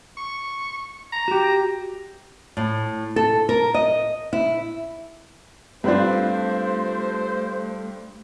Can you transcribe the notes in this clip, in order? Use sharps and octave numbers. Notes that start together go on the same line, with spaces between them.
C#6
A#5
F#4 G4
A2
A4
A#4
D#5
E4
G2 A3 C4 D4 F4 B4 C5